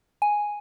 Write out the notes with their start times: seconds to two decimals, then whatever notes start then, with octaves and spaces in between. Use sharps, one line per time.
0.22 G#5